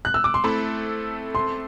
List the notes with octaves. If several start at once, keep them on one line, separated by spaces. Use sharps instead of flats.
F#6
E6
D6
C6
A3 C4 E4 A4 B5
C6